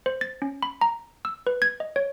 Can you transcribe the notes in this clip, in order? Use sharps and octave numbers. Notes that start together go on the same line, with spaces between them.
C5
A6
C#4
B5
A#5
E6
B4
G#6
D#5
C#5